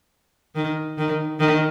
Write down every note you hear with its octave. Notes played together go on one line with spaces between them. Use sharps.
D#3
D#3
D#3